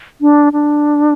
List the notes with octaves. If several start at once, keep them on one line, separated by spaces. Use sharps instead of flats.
D4
D4